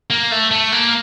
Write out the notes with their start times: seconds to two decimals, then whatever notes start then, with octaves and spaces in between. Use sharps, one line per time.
0.10 A#3
0.31 A3
0.51 A3
0.72 A#3